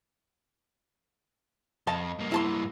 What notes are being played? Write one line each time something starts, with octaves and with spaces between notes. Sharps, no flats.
F2 D#5 F5 A5
G2 A#3
E4 A5 C6